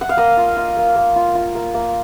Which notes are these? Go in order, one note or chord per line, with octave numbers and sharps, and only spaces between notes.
F#5
F5
A#3 D#5
F4
F4
A#3
A#3
F4
F4
A#3
A#3